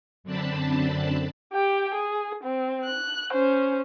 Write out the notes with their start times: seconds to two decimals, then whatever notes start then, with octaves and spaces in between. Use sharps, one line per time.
0.24 F#2 D3 C4 D4 A5 B5
1.53 G4 G5
1.94 G#4
2.44 C4
2.85 F#6
3.32 C#4 C5